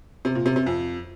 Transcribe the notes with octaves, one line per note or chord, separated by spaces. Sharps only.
C3
A#2
C3
C3
F2